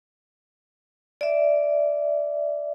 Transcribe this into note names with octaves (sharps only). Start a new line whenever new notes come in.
D5 E5